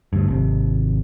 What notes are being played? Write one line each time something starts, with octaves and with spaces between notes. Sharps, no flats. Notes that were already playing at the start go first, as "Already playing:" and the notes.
D2 G2
G#1 C3